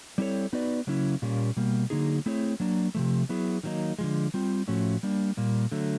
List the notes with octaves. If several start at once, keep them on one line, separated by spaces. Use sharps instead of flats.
G3 C4 E4 A4 C#5
B3 D#4 F#4 B4 D5
C#3 F#3 A#3 C#4 E4
A#2 G3 A#3 C#4
B2 G3 A#3
D3 F#3 A#3 D#4 G#4
A3 C4 E4 G#4 C#5
F#3 A#3 D4
C3 F3 A3
F#3 B3 E4 G#4
D#3 F#3 A#3 D#4
D3 F3 G#3
G3 C4 F4
A2 F3 A3 C#4 F#4
G3 A#3 D4
A#2 G3 A#3
D3 F#3 A3